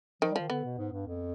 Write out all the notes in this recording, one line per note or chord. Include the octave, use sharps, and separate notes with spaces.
D#3 F3
G3
D#3 F3
D3 B3
B2
G#2
G2
F2